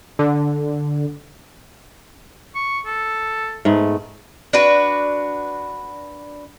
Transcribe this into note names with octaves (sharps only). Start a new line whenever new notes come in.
D3
C#6
A4
G#2 A3 B3
D4 F#4 B4